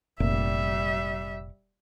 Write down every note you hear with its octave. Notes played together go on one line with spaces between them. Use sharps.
F1 A#2 G3 E5